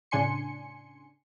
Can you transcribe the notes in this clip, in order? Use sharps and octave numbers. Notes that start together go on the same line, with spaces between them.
A2 C#3 D4 G#5 C6 C#7